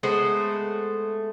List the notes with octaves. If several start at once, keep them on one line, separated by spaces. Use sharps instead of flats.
G#3 A3 B3 C5